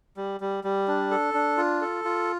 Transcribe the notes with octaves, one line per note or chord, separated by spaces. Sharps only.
G3
G3
G3
D4
A4
D4
F4
A4
F4